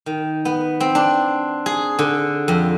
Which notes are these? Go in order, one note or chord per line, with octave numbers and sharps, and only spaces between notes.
D#3
B3
C4
D4
G#4
D3
F2